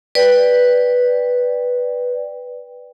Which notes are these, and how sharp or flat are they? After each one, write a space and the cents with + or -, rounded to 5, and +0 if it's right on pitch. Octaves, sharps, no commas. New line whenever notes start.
B4 +0 D5 +0 G5 +5